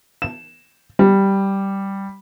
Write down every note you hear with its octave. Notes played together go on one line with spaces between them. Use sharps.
E7
G3